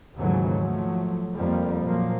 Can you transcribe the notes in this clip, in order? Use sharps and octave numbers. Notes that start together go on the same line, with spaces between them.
D#2 G#2 C#3 E3 F#3 A3
F3 F#3 A3
F2 G3 A#3
A#2 F3 F#3 A#3